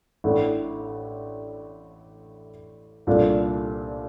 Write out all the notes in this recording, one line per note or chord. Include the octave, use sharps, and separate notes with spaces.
A1 A2 A3 D4
C2 A#2 A3 D4